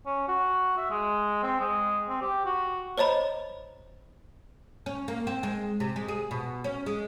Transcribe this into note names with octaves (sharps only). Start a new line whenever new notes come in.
C#4
F#4
E5
G#3
C4
G#3
C4
G4
F#4
C5 C#5 D#5 A#5 B5
C#4
A#3
C4
G#3
C3
G#3
G#4
B2
C#4
G#3